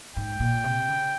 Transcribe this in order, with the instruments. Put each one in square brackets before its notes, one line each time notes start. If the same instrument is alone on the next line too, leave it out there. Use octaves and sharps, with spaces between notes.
[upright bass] G#2 [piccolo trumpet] G5
[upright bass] A#2
C3
C#3